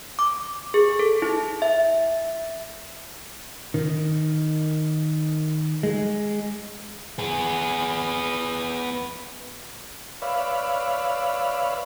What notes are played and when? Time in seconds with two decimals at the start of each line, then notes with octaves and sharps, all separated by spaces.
0.19 D6
0.74 G#4
0.99 A4
1.22 E4
1.62 E5
3.74 D#3
5.83 G#3
7.19 B3 G#4
10.22 B4 C#5 D5 E5 F5 B5